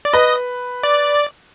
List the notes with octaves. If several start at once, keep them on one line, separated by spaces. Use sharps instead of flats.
D5
B4 D#5
D5